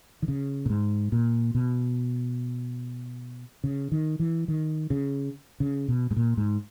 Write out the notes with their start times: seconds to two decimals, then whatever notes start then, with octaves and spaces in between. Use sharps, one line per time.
0.22 D#3
0.28 C#3
0.66 A#2
0.70 G#2
1.12 A#2
1.55 B2
3.64 C#3
3.92 D#3
4.19 E3
4.48 D#3
4.90 C#3
5.60 C#3
5.88 B2
6.11 G#2
6.16 A#2
6.37 G#2